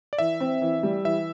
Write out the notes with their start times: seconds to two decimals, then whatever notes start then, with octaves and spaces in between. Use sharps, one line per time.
0.13 D5
0.18 E3 E5
0.40 C4
0.62 E3
0.83 G3
1.05 E3 E5